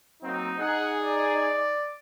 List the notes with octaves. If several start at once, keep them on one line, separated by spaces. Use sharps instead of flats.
F#3 A#3 C4 D#4
D#4 G#4 F#5
D5